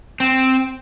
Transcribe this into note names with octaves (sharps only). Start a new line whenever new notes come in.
C4